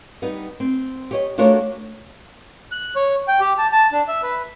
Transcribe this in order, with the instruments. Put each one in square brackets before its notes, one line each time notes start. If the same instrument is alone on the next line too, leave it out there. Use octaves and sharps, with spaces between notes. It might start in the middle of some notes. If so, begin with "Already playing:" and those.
[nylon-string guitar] G3 B3 D#4
C4
G4 C#5 D#5
A3 D4 F4 F#4 A#4 C#5
[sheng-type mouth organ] F#6
C#5
G5
G4
A5
A5
D4
E5
B4